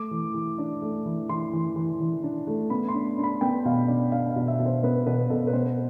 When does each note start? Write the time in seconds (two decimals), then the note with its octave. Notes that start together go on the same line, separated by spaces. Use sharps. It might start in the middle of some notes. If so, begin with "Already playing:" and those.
Already playing: A3 D6
0.11 E3
0.34 E3
0.58 D4
0.82 A3
1.05 E3
1.29 E3 C6
1.53 E3
1.76 E3
2.00 E3
2.23 D4
2.47 A3
2.70 B3 B5
2.89 C6
2.94 D4
3.18 D4
3.23 B5
3.41 B3 G5
3.65 B2 F5
3.88 D4 D5
4.12 D4 F5
4.30 F5
4.36 B2
4.48 E5
4.59 B2
4.66 C5
4.83 B3 B4
5.06 B2 B4
5.30 B2 A4
5.47 B4
5.53 B3 C5